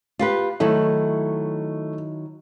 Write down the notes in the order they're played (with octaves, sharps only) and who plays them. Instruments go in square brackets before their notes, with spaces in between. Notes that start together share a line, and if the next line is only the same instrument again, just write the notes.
[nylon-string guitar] F4 G4 B4
[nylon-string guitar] D#3 F#3 E4 [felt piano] A3